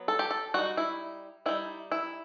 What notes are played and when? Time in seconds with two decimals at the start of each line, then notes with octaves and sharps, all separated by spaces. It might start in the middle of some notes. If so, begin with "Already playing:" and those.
Already playing: F#3 B3
0.08 A4
0.19 G4
0.31 A4
0.54 G3 D#4 F#4
0.77 E4
1.46 G3 D#4 E4
1.91 E4